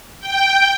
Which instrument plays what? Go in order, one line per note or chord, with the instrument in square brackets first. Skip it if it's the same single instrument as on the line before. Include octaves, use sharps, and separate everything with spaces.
[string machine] G5